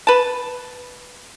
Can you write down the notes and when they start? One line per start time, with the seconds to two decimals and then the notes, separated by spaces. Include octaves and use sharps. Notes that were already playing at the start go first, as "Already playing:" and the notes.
0.07 B4 A5